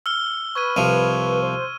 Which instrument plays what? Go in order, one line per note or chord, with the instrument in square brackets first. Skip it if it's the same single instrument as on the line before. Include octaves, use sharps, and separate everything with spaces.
[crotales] E6 F6 G7
[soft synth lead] B4 [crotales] C#6 G#6 D#7
[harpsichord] C2 F3 [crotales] D#7
[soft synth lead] C5